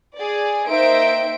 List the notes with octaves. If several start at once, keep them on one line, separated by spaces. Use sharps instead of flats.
G#4 D5
A#3 D#4 C5 E5 G5 D7